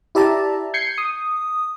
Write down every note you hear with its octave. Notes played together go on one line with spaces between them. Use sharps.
E4 G4 D5 E5 A5 A#5
G6 G#6 C7 C#7
D#6